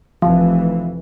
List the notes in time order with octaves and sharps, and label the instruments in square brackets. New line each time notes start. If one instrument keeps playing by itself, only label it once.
[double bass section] F1 E3 [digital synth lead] F3